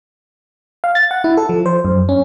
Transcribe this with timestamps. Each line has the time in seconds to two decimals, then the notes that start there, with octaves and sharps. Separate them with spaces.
0.84 F5
0.95 A6
1.11 F#5
1.24 E4
1.37 A4
1.49 F3
1.66 C5
1.85 F#2
2.09 C#4